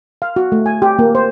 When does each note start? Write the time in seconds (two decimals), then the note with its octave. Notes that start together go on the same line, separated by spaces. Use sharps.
0.22 F5
0.36 F#4
0.52 A3
0.66 G#5
0.82 G4
0.99 A#3
1.15 C5